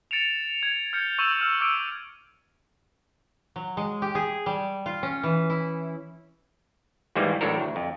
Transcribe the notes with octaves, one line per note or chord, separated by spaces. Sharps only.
A6 C#7 D7 E7 F7
G#6
F6 G6 G#6 C#7
C#6 E6 G6 D#7 E7 F#7
E6 F6
D6 E6 G6 D7 D#7
F#3
G#3
G4
G#4
G3
F4
C#4
E3
E4
D#2 G#2 E3 G3 G#3 A#3
A1 A2 F#3 D4 A4 A#4
D2
F2